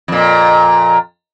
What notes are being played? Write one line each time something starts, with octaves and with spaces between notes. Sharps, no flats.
F2 A#2